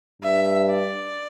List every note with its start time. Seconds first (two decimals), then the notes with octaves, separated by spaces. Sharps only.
0.22 G2 E5
0.71 D5